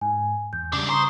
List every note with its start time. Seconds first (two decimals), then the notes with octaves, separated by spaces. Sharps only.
0.01 G#2 G#5
0.53 E2 G6
0.73 G#2 C#3 G3 D4
0.89 C5 A#5 C#6 D#6